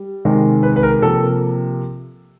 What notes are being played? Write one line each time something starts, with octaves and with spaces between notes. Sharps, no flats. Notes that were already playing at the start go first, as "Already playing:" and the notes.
Already playing: G3
C3 D#3 G#3
B4
B4
A#4
C3 F3 A#3 A4